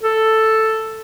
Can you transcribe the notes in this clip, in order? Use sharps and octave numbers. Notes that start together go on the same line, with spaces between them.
A4